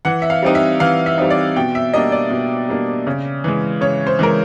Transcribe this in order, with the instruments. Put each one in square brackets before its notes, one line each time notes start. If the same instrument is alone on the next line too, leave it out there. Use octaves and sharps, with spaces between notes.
[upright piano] E3 F#5
E5
F5
G3 C4 D#4
E5
E3 F5
E5
G3 C4 D#4
D5
B2 G5
E5
G3 A#3 D4 D#5
D5
B2
G3 A#3 D4
C#3
E3 G#3
C#3 C#5
C5
E3 G#3 A#4